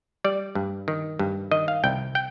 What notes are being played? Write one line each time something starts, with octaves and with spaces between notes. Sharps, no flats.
G3 D5
G2
D#3
G2
D#3 D#5
F5
C2 G5
G5